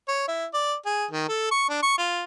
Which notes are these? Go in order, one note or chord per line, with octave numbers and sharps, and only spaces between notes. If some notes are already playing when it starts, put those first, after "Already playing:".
C#5
E4
D5
G#4
D#3
A4
C#6
D4
C#6
F4